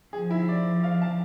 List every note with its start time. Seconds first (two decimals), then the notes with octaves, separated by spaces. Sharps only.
0.13 F3 G#4
0.31 E4
0.49 D5
0.84 F5
1.02 A5